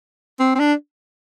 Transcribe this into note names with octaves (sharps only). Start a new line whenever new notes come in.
C4
C4
D4